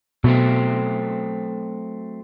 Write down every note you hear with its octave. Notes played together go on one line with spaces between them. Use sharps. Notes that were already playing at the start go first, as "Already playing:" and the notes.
B2 F#3 A3 C4